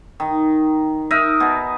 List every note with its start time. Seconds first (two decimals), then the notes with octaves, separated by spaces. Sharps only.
0.20 D#3
1.11 D#4 A#4 D#5 E5
1.40 B2